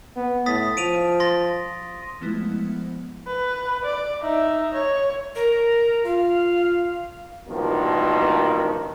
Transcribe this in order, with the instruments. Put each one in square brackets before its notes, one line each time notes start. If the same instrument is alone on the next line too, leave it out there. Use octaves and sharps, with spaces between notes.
[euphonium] B3
[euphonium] A2 [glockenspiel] D#6 A6 B6
[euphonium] F3 [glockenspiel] D7 D#7 F7
[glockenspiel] C6 A6 A#6
[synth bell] F3 G#3 A3 B3 E4
[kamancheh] B4
D5
D#4 E5
C#5
[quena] A#4
[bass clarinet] F4 [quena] F5
[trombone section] A1 G2 B2 D#3 F3 A#3